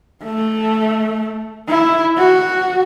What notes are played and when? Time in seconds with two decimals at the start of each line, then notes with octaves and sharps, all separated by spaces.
0.24 A3
1.69 E4
2.17 F#4